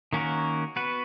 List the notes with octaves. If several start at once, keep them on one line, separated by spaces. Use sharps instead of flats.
D#3 A#3 C#4 F#4 A#4
B3 F#4 B4